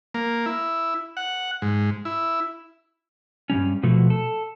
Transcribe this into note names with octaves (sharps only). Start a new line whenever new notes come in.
A#3
E4
F#5
G#2
E4
G2 C3 G3 C#4
B2 F3 A3 F#4
A4